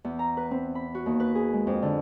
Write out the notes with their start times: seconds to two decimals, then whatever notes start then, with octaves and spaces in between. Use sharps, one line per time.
0.04 E2
0.19 A#5
0.37 B4
0.51 C4
0.75 B5
0.94 F#4
1.06 D#2
1.20 B4
1.35 G#4
1.53 G#3
1.67 F2
1.82 D3